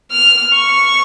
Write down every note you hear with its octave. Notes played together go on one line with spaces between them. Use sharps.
F6
C#6